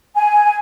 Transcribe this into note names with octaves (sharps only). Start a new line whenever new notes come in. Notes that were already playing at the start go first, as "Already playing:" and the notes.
G#5